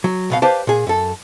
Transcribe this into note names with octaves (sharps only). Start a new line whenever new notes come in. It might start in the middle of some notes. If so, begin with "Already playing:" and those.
F#3
C2 B2 F5
G4 B4 C5 D5 F5 A5
A#2 G#4
F#2 A4